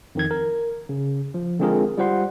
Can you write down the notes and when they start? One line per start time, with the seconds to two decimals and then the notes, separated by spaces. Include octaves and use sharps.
0.15 F2 D#3 G#6
0.31 A#4
0.89 C#3
1.34 F3
1.59 D3 G#3 C4 F4 G#4 A#4
1.98 G3 F4 C5 F#5 C6